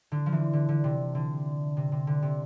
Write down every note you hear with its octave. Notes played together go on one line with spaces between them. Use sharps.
D3
F3
E3
D3
D3
C3
D3
C3
C3
D3
C3